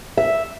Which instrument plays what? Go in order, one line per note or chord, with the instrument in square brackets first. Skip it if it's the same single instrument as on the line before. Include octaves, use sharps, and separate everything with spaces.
[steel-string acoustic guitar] E5